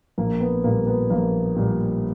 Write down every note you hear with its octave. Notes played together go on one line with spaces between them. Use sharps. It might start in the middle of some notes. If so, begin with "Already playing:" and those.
A#1 A#3
B3
A#2 G3 A#3
B3
A#1 A#3
A#2 G3